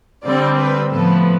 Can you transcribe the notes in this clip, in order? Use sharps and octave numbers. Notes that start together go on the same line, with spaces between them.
D3 G3 C4 D5
B4
A2 F3 B3 A4